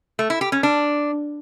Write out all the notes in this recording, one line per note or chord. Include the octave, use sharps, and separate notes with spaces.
A3
E4
G4
C#4
D4